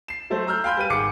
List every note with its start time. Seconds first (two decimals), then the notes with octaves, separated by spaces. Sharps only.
0.08 C7 E7
0.30 F#3 A3 A4 C5
0.47 A#5 E6 F6 G6
0.64 F5 G5 G#5 B5 C6 G6
0.77 G3 B4 D#7
0.90 G#1 G#4 D6 C#7